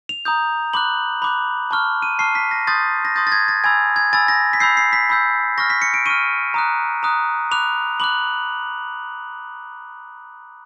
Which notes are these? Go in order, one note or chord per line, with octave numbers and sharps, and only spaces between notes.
F7
A#5 D#6 G6
B5 D6 F#6 F#7
B5 D6 F#6
A5 C#6 F6
D#7
A5 C#6 F6 C7
B6
A#6
C6 D#6 G6 A6
A#6
C6 D#6 G6 A6
A6
G#6
A6
G#5 B5 E6 G#6
G#6
G#5 B5 E6 A6
A#6
B6
B5 E6 G6 C7
C7
B6
B5 E6 G6
C#6 F6 A#6
B6
C#7
D7
C#6 F6 D#7
A#5 D#6 F#6
A#5 D#6 F#6
B5 D6 F#6 F7
B5 D6 F#6 F#7